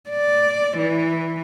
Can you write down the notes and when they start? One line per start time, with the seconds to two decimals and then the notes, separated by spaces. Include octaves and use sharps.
0.10 D5
0.78 E3